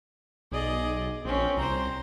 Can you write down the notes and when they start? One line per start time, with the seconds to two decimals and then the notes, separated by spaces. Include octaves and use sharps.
0.52 B1 G#4 D5 D#5
1.25 A#1 C4 C#4
1.57 C2 C5 A#5